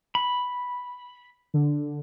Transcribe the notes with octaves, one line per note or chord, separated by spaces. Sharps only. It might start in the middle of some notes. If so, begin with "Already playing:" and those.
B5
D3